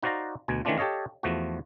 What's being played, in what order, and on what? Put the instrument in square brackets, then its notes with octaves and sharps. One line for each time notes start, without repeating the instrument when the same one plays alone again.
[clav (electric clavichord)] D#4 F#4 C5 D5 F5 A#5
D2 B2 G#5
D#3 E3 A3 C#4 D4 F4
G4 A4 C#5 D#5 F5
E2 F3 A3 F#4